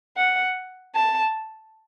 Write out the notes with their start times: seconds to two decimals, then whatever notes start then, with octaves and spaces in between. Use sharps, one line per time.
0.17 F#5
0.95 A5